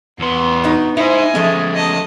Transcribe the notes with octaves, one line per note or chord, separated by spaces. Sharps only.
E2 B3 C6
B2 D#4
D#4 E4 C5 D#5 G#5
F3 G#3 A3 C#4
D#5 A5